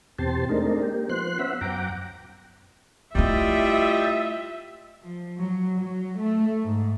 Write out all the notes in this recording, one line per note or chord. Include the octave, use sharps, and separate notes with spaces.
E2 B2 C4 G4 A5 C6
G#3 A3 C4 D4 D#4 A#4
A#3 G4
F3 B3 C5 C6 F#6
B3 C#4 C5 E5 F#5 B5
F#2 F#5 G5 A#5 D6
G3 A3 E4 F4 D#5 E5
F3
F#3
F#3
A3
G#2